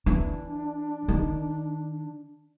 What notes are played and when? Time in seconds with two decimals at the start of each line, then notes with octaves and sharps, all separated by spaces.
0.06 E3 D4
1.08 D#3